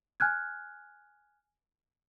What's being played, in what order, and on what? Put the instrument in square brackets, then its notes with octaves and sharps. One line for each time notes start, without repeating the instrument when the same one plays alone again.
[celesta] G#5 F6 F#6 G#6